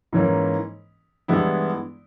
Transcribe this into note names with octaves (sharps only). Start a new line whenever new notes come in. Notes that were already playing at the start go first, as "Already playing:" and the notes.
G#2 E3 A#3 C#4
G2 E3 G#3 B3 E4